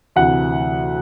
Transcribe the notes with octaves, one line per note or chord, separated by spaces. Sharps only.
D2 C3 E3 F#5